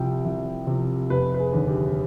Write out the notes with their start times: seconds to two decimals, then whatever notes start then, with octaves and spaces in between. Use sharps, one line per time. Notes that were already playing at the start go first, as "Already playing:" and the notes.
Already playing: C2 C3 F3 G5
0.25 C2
0.67 C3 F3
1.10 F1 B4
1.34 B4
1.39 G#4
1.53 D#2 D3
1.68 G4